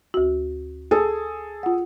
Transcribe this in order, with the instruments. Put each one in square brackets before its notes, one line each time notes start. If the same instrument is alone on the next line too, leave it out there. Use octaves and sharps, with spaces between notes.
[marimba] D2 F#4
[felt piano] G#4 A4
[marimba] F4 F#5